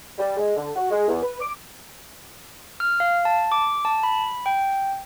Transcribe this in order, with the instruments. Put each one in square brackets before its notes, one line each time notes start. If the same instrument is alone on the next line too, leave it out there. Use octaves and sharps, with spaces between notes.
[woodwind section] G3
G#3
D3
F#4
G#3
E2
B4
D6
[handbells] F6
F5
A5
D6
A5
B5
G5